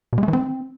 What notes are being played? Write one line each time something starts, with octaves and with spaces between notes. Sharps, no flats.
B2
G#3
A3
E3
C4